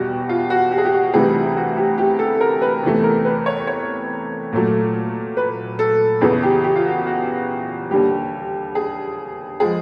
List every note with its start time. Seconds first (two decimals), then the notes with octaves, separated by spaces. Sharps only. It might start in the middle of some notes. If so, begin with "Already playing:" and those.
Already playing: E2 B2 G3 F#4 G4
0.29 F4
0.50 F#4
0.71 G4
0.78 G#4
0.85 G4
0.92 F#4
1.13 D2 C3 E3 G3 G#4
1.56 F#4
1.77 G4
1.98 G4
2.19 A4
2.40 A#4
2.62 B4
2.83 E2 C3 E3 A3
3.03 A#4
3.25 B4
3.46 C#5
3.67 C#5
4.52 A#2 F#3 A3
5.37 B4
5.79 A4
6.21 E2 C#3 E3 G#4
6.43 G4
6.64 G4
6.76 F4
6.85 F#4
7.06 F#4
7.91 D#2 D3 G3 G4
8.75 G#4
9.60 F3 G#3 G#4